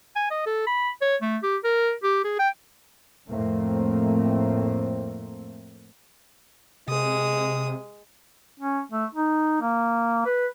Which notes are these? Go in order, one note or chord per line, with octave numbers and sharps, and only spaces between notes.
G#5
D#5
A4
B5
C#5
A3
G4
A#4
G4
G#4
G5
F2 A2 A3 A#3 C4
C3 G#3 D#6
C#4
A3
D#4
A#3
B4